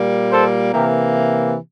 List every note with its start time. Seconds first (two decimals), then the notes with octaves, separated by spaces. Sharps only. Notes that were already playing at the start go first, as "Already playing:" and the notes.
Already playing: A#2 G3 A#3
0.31 A4 C5
0.72 C3 E3 A#3 G4 A#4